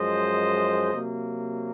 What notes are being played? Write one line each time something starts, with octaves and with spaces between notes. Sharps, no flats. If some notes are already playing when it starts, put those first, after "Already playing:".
Already playing: F#2 F3 G#3 C5 D#5
C3 F#3 A#3